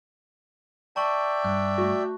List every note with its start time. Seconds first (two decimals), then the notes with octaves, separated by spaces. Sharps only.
0.96 D5 E5 G5 A5 C#6 F#7
1.44 G2 F#6
1.78 A3 F#4